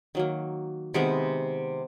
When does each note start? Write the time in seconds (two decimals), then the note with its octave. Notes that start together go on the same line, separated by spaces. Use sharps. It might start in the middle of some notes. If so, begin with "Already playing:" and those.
0.15 D#3 F#3 A#3
0.94 C3 D#3 G#3 B3